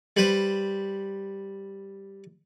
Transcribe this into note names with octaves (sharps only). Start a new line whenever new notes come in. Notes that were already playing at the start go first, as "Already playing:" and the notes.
G3 B4 C5